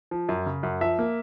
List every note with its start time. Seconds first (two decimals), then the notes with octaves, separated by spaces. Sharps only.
0.11 F3
0.29 F#2
0.46 C#3
0.63 F#2
0.81 F3 E5
0.99 A#3